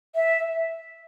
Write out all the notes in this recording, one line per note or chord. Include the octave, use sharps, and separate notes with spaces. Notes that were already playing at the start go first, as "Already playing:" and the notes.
E5